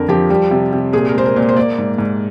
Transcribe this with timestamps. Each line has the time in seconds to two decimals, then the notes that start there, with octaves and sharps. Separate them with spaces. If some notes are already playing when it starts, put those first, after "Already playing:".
Already playing: F2 D3 A#4
0.09 F3 G4
0.30 G3 G4
0.51 C3
0.73 C3
0.93 A#2 G#4
1.09 A#4
1.14 G#3 C5
1.26 A#4
1.36 A#2
1.49 C5
1.56 A#3 D5
1.78 G#2
1.98 G#2